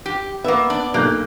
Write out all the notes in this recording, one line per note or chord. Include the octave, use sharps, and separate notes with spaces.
G4
A#3 B3 E5
D4
B1 A#3 F#6 G6